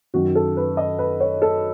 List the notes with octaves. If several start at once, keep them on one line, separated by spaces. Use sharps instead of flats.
F#2 D#3 F#3 F#4
A4
B4
D#5
B4
C#5
A4